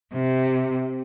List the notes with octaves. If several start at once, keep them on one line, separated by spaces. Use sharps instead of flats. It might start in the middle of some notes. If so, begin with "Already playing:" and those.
C3